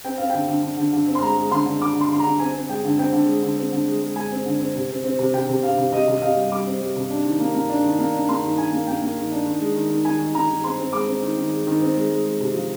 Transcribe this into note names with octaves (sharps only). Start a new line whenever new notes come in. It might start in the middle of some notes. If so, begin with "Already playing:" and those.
C4 G5
C4 F5
D3 G5
D3
D3
D3
D3
C4
C6
G#3 A#5
G#3
D3 C6
D3
D3 D6
D3
C6
D3 C6
A#5
D3
C4 G#5
C4
G#3 G5
D3
C4 G5
D3
G#3
D3
C4
D3
G#3
G#3
G#3 G#5
C4
D3
C4
C3
C4
C4
C3
C3 G5
C3
C3 F5
C3
C3 D#5
C3
D#5
C3 F5
G3
G3 D6
C4
G3
C3
D4
D#3
A#3
A#3
D4
D#3
A#3
D4
A#3 C6
D#3
D#3 G#5
A#3
A#3 G5
A#3
D#3
D4
D#3
G#3
D#3
D#3
D#3 G#5
D#3
D#3 A#5
D#3
C4 C6
C4
G#3 D6
C4
D#3
D#3
G#3
D#3
C4
G#3
G#3
G#3
C3
F3